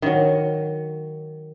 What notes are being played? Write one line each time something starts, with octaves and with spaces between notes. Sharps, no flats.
D#3 F#3